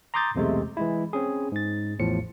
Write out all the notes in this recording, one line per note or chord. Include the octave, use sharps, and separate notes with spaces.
A#5 C6 D6 D#6 G6 A6
B1 E2 C3 G#3 A3
E3 G#3 E4
C4 C#4 G#4
G#2 A6
A1 E2 A2 F3 C#7